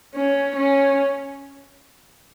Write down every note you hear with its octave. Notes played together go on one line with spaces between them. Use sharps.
C#4
C#4